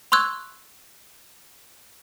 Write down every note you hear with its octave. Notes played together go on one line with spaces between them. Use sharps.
C6 C#6 E6 F#6 G#6